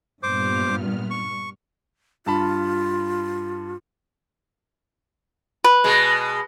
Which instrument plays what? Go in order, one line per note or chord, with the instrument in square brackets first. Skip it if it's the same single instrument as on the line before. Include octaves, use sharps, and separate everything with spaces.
[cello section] G2 [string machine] A#2 B3 F6 [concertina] C5 D6
[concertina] C#6
[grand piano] G2 A5 B5 [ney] F4
[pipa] B4
[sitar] B2 G#3